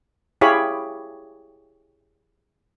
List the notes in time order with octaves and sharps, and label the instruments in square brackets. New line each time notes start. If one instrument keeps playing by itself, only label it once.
[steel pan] E4 G4 G#4 C#5 F5 B5